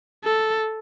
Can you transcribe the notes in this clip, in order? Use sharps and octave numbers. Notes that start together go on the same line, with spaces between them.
A4